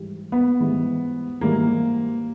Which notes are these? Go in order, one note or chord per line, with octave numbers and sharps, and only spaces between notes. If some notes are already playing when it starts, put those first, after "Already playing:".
Already playing: G#2 E3 G3
B3
G#2 E3 G3
G#2 E3 G3 A#3